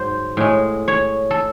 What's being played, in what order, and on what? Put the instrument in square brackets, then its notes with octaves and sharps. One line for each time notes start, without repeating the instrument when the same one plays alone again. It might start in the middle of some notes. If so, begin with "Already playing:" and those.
Already playing: [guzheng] G#2 F#3 C5
A2 G#3
C#5
A4